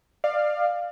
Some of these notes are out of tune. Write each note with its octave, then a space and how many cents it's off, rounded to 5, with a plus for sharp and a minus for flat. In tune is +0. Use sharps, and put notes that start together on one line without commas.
D5 +25 F5 +0